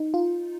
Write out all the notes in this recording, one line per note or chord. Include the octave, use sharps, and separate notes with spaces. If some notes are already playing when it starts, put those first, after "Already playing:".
Already playing: D#4
F4